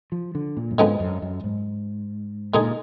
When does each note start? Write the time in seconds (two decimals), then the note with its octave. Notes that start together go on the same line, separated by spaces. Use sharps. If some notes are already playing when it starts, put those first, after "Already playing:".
0.12 F3
0.35 D3
0.57 A#2
0.71 F#2
0.78 G#2 D3 F3 G#3 B3
1.00 F#2
1.22 F#2
1.44 G#2
2.54 A#2 D3 G#3 D#4 G#4